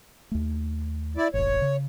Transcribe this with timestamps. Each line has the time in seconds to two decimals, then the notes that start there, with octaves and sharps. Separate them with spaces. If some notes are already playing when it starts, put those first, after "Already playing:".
0.31 D#2 A3
1.17 E4 D5
1.34 E1 A1 C#5
1.62 C#3